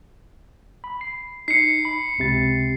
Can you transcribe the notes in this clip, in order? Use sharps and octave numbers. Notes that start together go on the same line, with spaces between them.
B5
C7
D#4 C7 C#7
B5
C#2 C3 A6